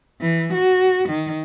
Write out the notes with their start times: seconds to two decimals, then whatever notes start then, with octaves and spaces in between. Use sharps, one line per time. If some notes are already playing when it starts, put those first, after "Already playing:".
0.21 E3
0.54 F#4
1.09 D#3